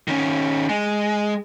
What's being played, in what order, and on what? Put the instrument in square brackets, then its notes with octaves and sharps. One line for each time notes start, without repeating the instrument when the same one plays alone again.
[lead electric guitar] D#3 C#4
G#3